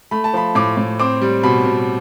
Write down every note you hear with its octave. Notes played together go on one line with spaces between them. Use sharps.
A3 B5
A5
F3 B5
A2 D6
A2
C4 D6
G3
B2 B5
B2